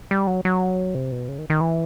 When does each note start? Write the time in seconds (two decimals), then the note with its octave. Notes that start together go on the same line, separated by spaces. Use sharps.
0.11 G3
0.27 F#3
0.45 F#3
0.95 C3
1.12 B2
1.29 C#3
1.39 D#3
1.50 D#3
1.61 E3